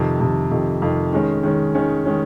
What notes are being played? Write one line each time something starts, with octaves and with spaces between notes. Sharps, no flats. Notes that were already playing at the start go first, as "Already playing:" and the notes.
Already playing: F2 C3 D#3
F2 C3 D#3
F2 C3 D#3
F2 C3 D#3
D#3 G#3 C#4
D#3 G#3 C#4
D#3 G#3 C#4
D#3 G#3 C#4